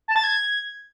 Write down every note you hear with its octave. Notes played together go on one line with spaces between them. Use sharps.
A5
A6
G#6